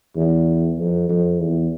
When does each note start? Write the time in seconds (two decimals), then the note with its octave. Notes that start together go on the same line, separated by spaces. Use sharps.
0.16 E2
0.79 F2
1.09 F2
1.40 E2